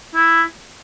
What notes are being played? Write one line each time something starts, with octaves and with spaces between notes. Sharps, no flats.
E4